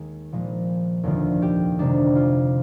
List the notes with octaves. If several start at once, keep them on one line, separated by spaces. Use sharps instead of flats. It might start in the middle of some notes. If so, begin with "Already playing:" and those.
Already playing: D#2 D#3 G#3 G#4
A#1 A#2 F3 G#3
F1 D#2 D3 F3 F4
G4
F2 C3 D#3 G#3 D4
F4